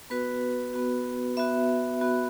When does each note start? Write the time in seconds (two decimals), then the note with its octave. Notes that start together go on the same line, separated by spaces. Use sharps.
0.10 B3 F#4 B4
0.74 B3 F#4
1.37 B3 F#4 E5
2.01 B3 F#4